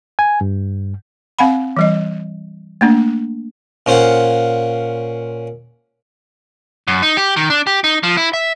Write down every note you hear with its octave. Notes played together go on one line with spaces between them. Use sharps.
G#5
G2
C4 F5 F#5 B5
E3 G3 D#5
A3 A#3 D4
A#2 C#4 C5 F5 F#5
F#2
D#4
G4
D#3
D4
G4
D#4
F3
E4
E5